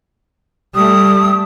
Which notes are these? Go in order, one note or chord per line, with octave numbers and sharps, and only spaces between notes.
G3 A3 D#6